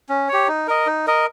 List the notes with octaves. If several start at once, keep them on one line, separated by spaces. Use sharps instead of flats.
C#4
G4 C#5
D#4
A#4 D#5
D#4
A#4 D#5